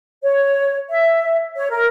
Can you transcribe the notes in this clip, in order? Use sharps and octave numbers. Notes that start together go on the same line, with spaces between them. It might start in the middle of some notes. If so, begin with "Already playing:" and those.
C#5
E5
C#5
A#4